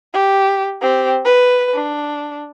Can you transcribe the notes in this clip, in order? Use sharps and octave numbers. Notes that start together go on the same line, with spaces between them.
G4
C4 G4
B4
D4